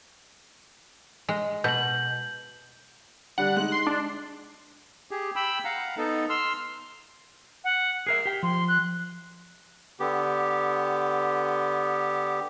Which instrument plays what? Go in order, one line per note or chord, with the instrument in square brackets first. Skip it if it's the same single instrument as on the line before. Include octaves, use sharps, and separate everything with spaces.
[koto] G#3
[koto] B2 [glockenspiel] G6 F#7
[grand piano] D3 G3 D4 [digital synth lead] F#5
[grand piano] G#3 D#4 [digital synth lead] F#6
[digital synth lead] C6
D4
[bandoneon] G4 G#4
G5 B5 E6
F5 F#5 A#5
B3 D#4 A4
C6 E6 F6
[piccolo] F#5
[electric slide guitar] G#4 A#4 E5 [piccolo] C7
[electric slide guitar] G4 G5
[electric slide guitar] F3 [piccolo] C6
[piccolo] F#6
[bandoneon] D3 B3 G4